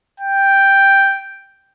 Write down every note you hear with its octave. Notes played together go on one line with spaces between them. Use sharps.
G5